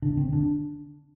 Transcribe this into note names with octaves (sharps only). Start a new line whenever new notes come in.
D3 D4
D3 C4
D3 D4